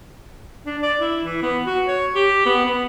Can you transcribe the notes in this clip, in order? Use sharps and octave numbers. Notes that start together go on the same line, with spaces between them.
D4
D5
E4
E3
B3
F#4
C#5
G4
B3
B3